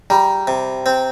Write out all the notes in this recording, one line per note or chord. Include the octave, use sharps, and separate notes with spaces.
G3 A#5
C3
C4